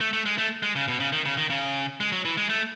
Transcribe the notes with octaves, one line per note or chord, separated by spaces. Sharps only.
A3
A3
G#3
A3
G#3
C#3
B2
C#3
D#3
C#3
D#3
C#3
G#3
F#3
E3
G#3
A3